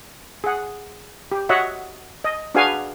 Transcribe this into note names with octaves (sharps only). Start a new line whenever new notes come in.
G#4 F#5
G4
F#4 C#5 D#5 E5 F#5
D#5
D4 F#4 G#4 B4 F5 G#5